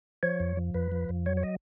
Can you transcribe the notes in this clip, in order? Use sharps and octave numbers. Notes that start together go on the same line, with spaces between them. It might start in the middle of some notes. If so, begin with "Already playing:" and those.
F3 C#5
F2
F3
F2 B4
F3
F2
F#3 C#5
C#5
D#5